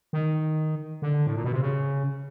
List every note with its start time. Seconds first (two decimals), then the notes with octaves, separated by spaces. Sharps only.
0.13 D#3
1.02 D3
1.26 A2
1.36 A#2
1.44 B2
1.52 C3
1.62 C#3